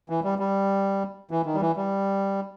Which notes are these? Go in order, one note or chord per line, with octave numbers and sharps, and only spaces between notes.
E3
G3
G3
E3
D#3
G3
E3
G3